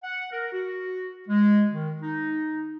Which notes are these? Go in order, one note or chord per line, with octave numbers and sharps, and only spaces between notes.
F#5
A#4
F#4
G#3
D#3
D#4